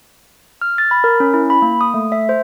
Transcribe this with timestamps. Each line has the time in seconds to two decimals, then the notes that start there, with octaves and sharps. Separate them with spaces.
0.61 F6
0.78 A6
0.91 B5
1.04 A#4
1.20 C#4
1.34 E4
1.50 B5
1.62 A#3
1.81 D#6
1.94 A3
2.12 E5
2.29 C5